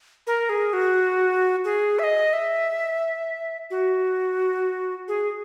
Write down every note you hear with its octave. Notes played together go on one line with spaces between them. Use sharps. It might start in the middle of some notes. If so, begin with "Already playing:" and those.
A#4
G#4
F#4
G#4
E5
D#5
E5
F#4
G#4